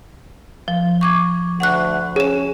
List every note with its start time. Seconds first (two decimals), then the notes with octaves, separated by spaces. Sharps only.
0.68 F3
1.01 C#6 D6 G#6
1.60 D2 F#5 C#6 F#6
2.16 C#4 G#4 E7